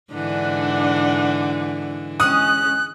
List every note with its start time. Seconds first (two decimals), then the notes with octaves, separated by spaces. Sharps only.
0.13 G#2 D3 E3 D4 F#5
2.20 G#3 C#4 D#6 F#6